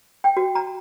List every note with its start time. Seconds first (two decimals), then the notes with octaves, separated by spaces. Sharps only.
0.24 G5
0.37 F#4
0.55 A#5